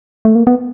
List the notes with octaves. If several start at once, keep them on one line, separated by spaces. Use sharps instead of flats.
A3
A#3
B3